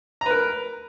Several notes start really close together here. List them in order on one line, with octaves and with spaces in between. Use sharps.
A#5 B4 A#4